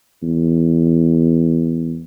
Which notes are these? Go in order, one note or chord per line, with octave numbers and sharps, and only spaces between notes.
E2